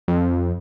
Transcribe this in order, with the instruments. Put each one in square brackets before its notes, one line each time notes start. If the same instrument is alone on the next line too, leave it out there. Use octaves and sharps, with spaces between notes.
[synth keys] F2